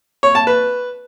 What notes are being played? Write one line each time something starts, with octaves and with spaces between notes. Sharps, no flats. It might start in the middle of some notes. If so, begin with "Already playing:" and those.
C#5
A5
B4